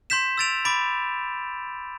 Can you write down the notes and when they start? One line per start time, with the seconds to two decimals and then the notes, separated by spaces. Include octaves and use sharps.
0.10 C6 G6 B6 E7
0.38 E6 A6 D7 F7
0.65 B5 D6 A6 D7